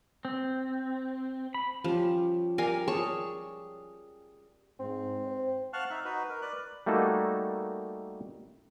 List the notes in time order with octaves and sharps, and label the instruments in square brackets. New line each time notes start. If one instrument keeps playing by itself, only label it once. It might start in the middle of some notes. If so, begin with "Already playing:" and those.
[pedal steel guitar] C4
B5
[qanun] F3 [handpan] C#4 G4
[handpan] G4 D5 [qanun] A#4 F5 G#5
[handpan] G#4 [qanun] C#5 A5 C#6
[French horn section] G#2 [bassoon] C4
[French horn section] C5
[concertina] F5 F#5 A5 C#6 F6 F#6
D#4 E5
D#4 F#4 B4
A#4
B4 D5 F#6
[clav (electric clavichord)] G3 A3 A#3 D#4 F#4 A4